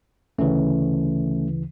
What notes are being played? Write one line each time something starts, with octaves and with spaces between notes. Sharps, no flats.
D2 C#3 E3 A3 C#4